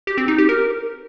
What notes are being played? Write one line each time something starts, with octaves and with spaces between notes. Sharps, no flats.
G4
C4
D#4
G4
A#4